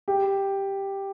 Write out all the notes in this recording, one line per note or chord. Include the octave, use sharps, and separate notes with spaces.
G4